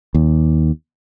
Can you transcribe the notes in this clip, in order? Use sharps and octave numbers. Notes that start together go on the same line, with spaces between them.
D#2